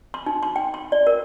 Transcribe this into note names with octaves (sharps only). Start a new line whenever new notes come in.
C6
D#4
C6
G5
C6
D5
A#4